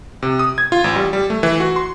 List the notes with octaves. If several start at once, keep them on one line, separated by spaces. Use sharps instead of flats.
C3
D#6
G#6
F4
A1
G3
G3
A3
E3
F#4
C6